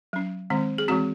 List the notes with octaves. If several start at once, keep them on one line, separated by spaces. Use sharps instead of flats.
F#3 C#4
D#3 G#3 C4
G#4
E3 G#3 C4 F#4